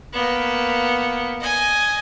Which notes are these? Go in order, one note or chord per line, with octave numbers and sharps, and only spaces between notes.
A#3 B3
D#5 G#5